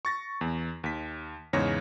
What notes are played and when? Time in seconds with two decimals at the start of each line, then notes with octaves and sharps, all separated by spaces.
0.05 C#6 A6 A#6
0.41 E2
0.84 D#2 B6
1.53 E2 G#2 C#3 C#5 A#6